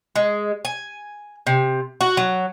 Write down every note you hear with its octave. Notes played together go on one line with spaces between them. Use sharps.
G#3
G#5
C3
F#4
F#3